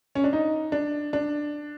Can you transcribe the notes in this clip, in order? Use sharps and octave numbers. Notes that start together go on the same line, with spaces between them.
C#4
D4
D#4
D4
D4